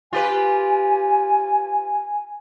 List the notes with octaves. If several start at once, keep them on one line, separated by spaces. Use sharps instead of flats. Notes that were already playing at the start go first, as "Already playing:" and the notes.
F4 G4 B4 G#5